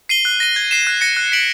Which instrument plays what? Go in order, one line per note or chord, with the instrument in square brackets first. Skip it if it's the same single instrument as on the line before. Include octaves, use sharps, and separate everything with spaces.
[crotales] C7 D#7 G7
F#6
A#6 D#7 G7
G#6
C7 E7
F#6
A#6 C#7
F#6
B6 D7 F#7